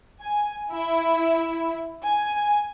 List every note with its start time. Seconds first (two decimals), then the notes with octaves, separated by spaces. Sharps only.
0.22 G#5
0.70 E4
2.04 G#5